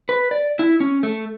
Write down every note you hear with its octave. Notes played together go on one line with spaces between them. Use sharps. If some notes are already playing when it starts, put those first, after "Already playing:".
B4
D5
E4
C#4
A3